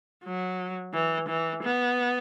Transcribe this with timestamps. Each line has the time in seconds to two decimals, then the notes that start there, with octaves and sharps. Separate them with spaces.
0.25 F#3
0.94 E3
1.29 E3
1.63 B3